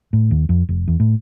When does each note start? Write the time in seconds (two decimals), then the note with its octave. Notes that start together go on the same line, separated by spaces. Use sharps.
0.13 A2
0.31 D#2
0.49 F2
0.69 F1
0.88 E2
1.00 A2